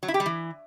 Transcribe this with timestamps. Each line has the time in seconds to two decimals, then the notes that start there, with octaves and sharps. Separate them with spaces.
0.03 F#3
0.08 E4
0.14 G4
0.20 G3
0.26 E3